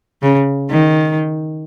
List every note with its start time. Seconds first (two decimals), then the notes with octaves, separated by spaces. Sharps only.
0.22 C#3
0.71 D#3